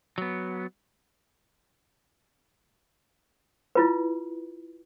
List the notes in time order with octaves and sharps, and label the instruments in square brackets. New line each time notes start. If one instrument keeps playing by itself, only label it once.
[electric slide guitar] F#3 B3
[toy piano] E4 F4 B4